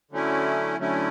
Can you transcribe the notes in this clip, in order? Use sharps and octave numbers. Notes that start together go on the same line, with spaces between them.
D3 F#3 A3 C#4 E4
D3 F#3 A3 C#4 E4